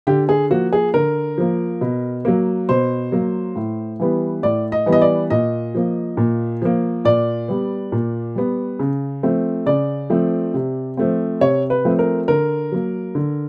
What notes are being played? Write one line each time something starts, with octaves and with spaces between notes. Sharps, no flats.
D3 G4
G#4
F3 A#3 F#4
G#4
D3 A#4
F3 A#3
B2
F#3 A#3
B2 C5
F#3 A#3
A2
E3 G3 B3
A2 D5
D#5
E3 G3 B3
D#5
D5
A#2 D#5
F3 A#3
A#2
F3 A#3
A#2 D5
G3 B3
A#2
G3 B3
C#3
F3 A3 C4
C#3 D5
F3 A3 C4
C3
F3 A3 C4
C3 C#5
B4
F3 A3 C4
A#4
D3 A#4
F#3 A#3
D3